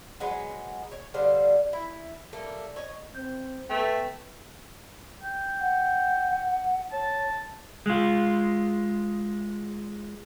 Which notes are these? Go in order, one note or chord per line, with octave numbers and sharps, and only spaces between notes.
F#3 G#3 B3
C#5
D3 G3 C5 F5
E4
G3 A3 A#3
C#5 D#5
C4 G6
A3 B3 B4 G5
G5
F#5
C#5 A5
G#3 F4